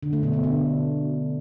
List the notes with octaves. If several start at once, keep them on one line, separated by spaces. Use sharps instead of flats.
D3
A3
B2
B2
D3